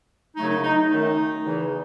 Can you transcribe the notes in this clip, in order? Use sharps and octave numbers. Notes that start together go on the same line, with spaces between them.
F#2 C#3 F#3 A3 D#4
D#4
D#4
D#4
F#2 D#3 A3
E2 C#3 E3